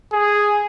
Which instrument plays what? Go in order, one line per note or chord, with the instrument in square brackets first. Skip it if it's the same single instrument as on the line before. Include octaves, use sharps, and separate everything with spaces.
[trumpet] G#4